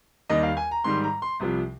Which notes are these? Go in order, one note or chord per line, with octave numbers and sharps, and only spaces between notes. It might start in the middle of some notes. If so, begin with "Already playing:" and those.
D#2 D#3 G3 D#5
F5
G#5
A#5
G#2 D#3 G3 C6
A#5
C6
C2 C3 F3